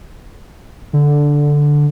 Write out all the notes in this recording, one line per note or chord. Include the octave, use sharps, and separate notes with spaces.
D3